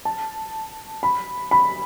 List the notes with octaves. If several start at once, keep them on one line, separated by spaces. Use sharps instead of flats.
A5
B5
B5